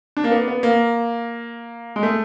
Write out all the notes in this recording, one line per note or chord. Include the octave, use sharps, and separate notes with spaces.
D4
A#3
B3
B3
A#3
G#3
A3